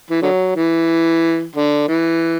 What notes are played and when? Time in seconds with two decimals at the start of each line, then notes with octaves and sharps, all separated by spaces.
0.10 E3
0.22 D3 F#3
0.56 E3
1.55 D3
1.88 E3